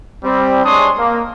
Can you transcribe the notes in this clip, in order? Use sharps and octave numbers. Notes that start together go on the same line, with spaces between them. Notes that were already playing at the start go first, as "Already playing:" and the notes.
G3 C4
G#3 D4 C#5 C6 D#6
A#3